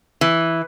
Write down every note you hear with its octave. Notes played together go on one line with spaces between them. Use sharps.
E3